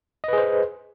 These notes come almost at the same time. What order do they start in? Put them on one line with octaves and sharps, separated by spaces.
D#5 B4 G#4 C5